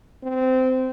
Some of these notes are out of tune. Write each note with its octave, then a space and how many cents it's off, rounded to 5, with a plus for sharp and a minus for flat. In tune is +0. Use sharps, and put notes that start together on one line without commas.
C4 -20